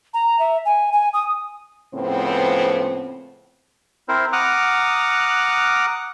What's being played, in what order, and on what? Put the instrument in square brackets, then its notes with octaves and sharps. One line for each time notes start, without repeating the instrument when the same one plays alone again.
[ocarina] A#5
E5
G#5
G#5
D#6
[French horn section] A2 C#3 F3 B3 C4
[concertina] C4 E4 A#4 C5
F#5 A#5 D6 D#6 F6 F#6